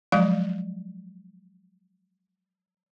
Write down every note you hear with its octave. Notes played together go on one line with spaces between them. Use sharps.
F3 F#3 G#3 F5